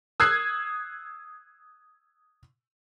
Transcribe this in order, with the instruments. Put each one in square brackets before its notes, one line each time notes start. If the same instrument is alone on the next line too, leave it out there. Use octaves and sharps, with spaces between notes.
[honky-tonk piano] D#6 E6 F#6 G#6 C7